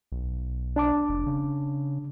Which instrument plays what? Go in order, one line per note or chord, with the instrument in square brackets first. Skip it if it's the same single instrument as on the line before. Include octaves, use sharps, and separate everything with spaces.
[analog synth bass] B1
[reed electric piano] D4 A5 D6
[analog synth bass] F1
C#3